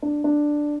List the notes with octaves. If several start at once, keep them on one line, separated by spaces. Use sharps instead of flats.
D4
D4